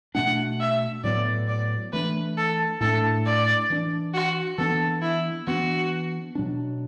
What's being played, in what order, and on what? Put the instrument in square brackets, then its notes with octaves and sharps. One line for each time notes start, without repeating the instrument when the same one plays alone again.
[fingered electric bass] B2 A3 D4 [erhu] F#5
[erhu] E5
[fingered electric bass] A2 F#3 B3 [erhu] D5
[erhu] D5
[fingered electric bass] E3 A3 D4 [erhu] B4
[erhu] A4
[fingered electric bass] A2 A3 D4 [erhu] A4
[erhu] D5
[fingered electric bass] E3 D4
[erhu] F#4
[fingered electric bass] E3 B3 D4 [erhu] A4
[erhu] E4
[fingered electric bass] E3 B3 D4 [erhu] F#4
[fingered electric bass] B2 F#3 D4